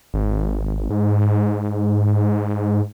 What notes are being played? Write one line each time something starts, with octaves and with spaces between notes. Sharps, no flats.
G#1
G#2